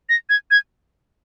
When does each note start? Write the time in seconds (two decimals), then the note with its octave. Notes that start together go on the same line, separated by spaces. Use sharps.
0.09 A#6
0.29 G#6
0.51 G#6